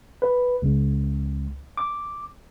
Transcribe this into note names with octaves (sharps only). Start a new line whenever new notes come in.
B4
C#2
D6